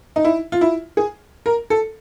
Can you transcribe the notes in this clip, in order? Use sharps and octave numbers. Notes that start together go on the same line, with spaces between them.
D#4
E4
F4
E4
G#4
A#4
A4